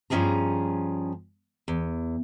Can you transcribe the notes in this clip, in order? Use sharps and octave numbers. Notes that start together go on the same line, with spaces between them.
G2 F3 C#4 D4 G#4 A#5
E2